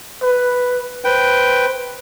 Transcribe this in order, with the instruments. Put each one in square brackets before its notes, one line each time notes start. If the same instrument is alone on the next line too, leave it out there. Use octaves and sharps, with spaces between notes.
[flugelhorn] B4
[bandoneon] B4 G5 [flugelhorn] C5